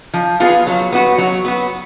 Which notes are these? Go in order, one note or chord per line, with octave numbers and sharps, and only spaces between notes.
F3
B3 F4 G#4
F#3
B3 F#4
F#3
B3 F#4